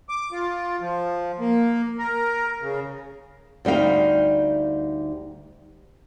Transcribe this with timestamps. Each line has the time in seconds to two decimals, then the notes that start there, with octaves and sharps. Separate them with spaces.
0.09 D6
0.32 F4
0.81 F3
1.39 A#3
1.98 A#4
2.61 C#3
3.65 D2 G3 D#4 F5 G5